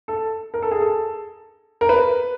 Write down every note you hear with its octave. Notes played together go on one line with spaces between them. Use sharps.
A4
A#4
A4
G#4
A4
A#4
B4